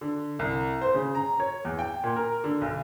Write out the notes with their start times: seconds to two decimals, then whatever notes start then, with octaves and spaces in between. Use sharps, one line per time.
0.01 D3
0.39 C2
0.82 C5
0.94 C#3
1.15 A#5
1.40 C#5
1.65 E2
1.79 G5
2.04 A#2
2.16 A#4
2.44 D3
2.61 B1